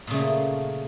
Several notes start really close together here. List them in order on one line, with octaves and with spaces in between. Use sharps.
A#2 C#3 A3 A#3